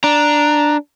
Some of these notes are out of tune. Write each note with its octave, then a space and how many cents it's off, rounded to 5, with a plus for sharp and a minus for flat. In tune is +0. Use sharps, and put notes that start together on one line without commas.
D4 +0 A#5 +0